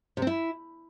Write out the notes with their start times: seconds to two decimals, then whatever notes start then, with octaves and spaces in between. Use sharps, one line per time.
0.17 C3
0.22 C4
0.27 E4